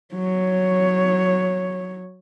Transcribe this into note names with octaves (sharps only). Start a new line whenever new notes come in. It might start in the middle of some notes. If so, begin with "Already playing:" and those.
F#3 C#5